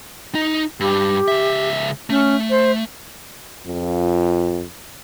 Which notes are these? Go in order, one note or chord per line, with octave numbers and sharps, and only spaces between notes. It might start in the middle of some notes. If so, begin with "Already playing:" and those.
D#4
G2 G4
C#2 E5
A3 C#4
C5
F2 F4